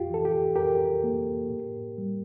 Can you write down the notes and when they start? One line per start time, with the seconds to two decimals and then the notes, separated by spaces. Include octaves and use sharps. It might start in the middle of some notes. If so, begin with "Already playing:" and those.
Already playing: F2 F4 G4
0.09 E3 A4
0.25 G4
0.56 F2 G4 A#4
1.04 A#3
1.50 A2
1.98 G3